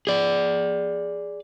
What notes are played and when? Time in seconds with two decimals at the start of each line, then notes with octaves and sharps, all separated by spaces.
0.07 G#4 D5